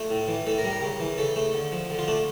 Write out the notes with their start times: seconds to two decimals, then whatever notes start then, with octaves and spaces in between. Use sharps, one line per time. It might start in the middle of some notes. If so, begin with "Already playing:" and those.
Already playing: A3 F4
0.10 A2
0.28 E3
0.47 A2 A4
0.58 A#4
0.64 G3
0.70 A#4
0.82 C#3
1.00 E3
1.18 C#3 A4
1.36 A3
1.54 D3
1.72 F3
1.90 D3
1.99 F4
2.08 A3 D4